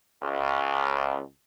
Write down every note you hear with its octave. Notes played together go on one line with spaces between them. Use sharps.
C#2